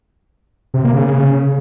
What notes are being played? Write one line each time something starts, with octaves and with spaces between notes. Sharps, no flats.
C3
A#3
C#3